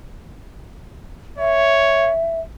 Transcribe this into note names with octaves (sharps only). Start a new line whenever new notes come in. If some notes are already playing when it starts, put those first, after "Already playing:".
C#5 E5